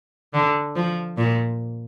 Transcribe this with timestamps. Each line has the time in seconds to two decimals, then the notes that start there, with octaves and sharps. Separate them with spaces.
0.34 D3
0.76 F3
1.18 A#2